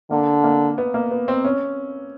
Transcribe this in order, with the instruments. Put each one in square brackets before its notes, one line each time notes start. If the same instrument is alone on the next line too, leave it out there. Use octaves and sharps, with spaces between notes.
[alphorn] D3 [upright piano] A#3
[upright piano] A#3
B3
A#3
B3
C4
C#4